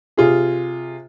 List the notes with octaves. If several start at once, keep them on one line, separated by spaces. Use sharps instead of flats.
C3 F4 G#4